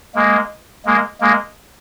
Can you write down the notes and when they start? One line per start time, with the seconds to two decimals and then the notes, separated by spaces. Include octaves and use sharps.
0.15 G#3 A#3
0.86 G#3 A#3
1.21 G#3 A#3